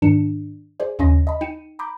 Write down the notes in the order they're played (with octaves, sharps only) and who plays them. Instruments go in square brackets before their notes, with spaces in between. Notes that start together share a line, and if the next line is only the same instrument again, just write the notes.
[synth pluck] G#2 D#3 D4 C#7 E7
G#4 C5 D5
D#2 C#3 C#4 D#5 C6 A#6
D#5 A5 B5
D#4 G5 C#7 D#7 E7
A#5 B5 D6 G6